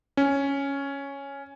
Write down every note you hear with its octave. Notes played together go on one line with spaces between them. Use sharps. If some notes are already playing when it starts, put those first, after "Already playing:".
C#4